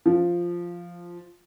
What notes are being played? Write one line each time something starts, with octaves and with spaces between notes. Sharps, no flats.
F3